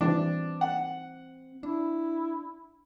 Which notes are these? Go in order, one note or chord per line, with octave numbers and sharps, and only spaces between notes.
E3 G3 C4 D4
F#5
D4 E4